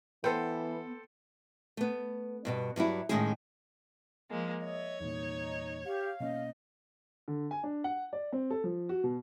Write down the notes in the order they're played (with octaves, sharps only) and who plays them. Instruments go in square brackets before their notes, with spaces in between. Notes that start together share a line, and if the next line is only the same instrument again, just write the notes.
[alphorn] E3 [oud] B3 [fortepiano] A4 C5 G5
[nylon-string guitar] A3 B3
G2 B2 B3
G2 F#3 G3 E4
A2 D#3 G#3 C#4 E4 G#4
[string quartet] F3 G#3 A#3
[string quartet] C#5 [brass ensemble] D#5 E5
[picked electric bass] E2 A#2 [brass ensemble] D#4
[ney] G4 [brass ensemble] F5
[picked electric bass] B2 A#3 C#4 [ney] D#5
[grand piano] D3
G#5
D4
F#5
D5
C4
A4
F3
F#4
B2